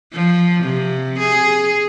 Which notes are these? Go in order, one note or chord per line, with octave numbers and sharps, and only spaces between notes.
F3
C3
G#4